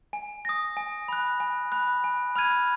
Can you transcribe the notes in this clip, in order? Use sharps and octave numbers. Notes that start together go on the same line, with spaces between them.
G#5
D#6 A#6
G#5
B5 F#6
G#5
B5 F#6
G#5
B5 F6 G#6 D#7